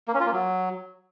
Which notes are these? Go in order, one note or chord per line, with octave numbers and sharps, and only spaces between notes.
A#3
C#4
F4
A#3
F#3